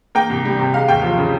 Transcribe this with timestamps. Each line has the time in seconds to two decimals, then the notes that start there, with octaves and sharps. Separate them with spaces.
0.15 A#3 G5
0.29 C2
0.45 G3
0.59 C3
0.74 G#3 F5
0.88 D#2 G5
1.02 F3 F5
1.18 C#3